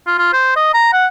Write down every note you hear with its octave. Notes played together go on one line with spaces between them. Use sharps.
F4
F4
C5
D#5
A#5
F#5